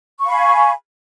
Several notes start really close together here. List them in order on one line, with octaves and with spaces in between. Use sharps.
C#6 F5 B5 G#5